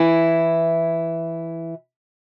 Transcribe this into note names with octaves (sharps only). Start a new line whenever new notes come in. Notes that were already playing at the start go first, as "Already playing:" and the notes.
Already playing: E3 E4